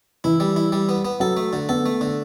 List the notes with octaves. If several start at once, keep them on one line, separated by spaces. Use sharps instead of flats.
E3 E4
G3
E4
G3
B3
B3
F#3 A4
A3
D3
B3 A4
A3
D3